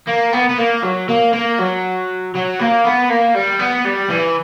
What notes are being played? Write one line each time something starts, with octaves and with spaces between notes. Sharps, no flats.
A#3
B3
B3
A#3
F#3
A#3
A#3
F#3
F#3
A#3
B3
A#3
G3
B3
G3
E3